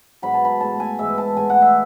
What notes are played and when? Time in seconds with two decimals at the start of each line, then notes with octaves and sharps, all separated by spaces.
0.22 G#2 F#3 B3 B5
0.34 A5
0.45 B5
0.61 A2 G#3 B3 A5
0.80 G#5
0.99 G#2 E3 G#3 E5
1.18 A5
1.37 A2 G#3 B3 G#5
1.50 F#5
1.62 E5